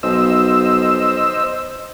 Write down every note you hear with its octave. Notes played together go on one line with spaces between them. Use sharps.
B1 C5 D#5 E6